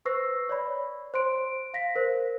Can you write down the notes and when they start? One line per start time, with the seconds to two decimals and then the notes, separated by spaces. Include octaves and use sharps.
0.05 B4 C5 C#6 E6 A#6 C7
0.49 C#5 D5 B5
1.14 C5 C6 D7
1.74 F5 A#6 B6
1.95 A#4 C5